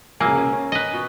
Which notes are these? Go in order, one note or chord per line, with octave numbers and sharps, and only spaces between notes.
C#2 F#2 C#3 A#3 G#5 E6
C#3
C#4
B4 D#5
B2